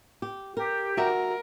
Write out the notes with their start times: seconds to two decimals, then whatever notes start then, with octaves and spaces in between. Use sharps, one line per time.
0.22 G4
0.57 G4 A#4
0.97 F#4 A#4 E5